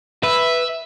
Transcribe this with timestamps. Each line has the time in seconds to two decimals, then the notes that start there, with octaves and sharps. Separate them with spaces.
0.23 B4 E5